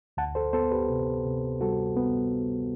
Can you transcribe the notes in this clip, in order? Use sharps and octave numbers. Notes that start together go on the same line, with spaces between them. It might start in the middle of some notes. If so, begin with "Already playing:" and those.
D2 F#5 A5
A4 C5
B3 A4 C5
G4 B4
C3
C3
G3 F#4 A4
B3